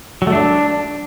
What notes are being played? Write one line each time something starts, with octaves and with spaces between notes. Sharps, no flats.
F#3
A3
D4